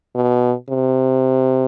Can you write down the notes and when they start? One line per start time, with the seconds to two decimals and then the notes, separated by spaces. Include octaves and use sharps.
0.15 B2
0.69 C3